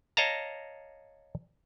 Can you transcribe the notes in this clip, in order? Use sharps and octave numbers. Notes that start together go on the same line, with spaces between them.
C#5 D#5 F5 A5 A#5